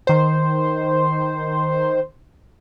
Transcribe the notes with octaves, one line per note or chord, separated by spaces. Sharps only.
D#3 C5